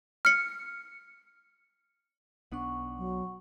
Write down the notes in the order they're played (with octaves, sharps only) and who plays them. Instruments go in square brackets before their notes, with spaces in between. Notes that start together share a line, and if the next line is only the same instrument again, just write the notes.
[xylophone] F6 C#7
[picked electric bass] B1 B3 D4 [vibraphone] F#5 C#6
[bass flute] F#3